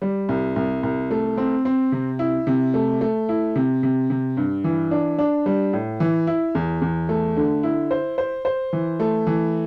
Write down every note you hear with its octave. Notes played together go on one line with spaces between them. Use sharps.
G3
C2
C2
C2
A3
C4
C4
C3
E4
C3
A3
A3
E4
C3
C3
C3
G2
E3
D4
D4
G3
A2
E3
E4
E2
E2
A3
D3
E4
C5
C5
C5
E3
A3
E3